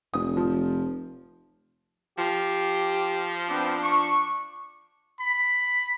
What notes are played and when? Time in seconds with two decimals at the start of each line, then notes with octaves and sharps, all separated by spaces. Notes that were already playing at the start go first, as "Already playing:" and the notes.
0.14 F1 D#6
0.37 F3
2.18 F3 G4
3.49 B3 C4 D4
3.82 C#6
5.19 B5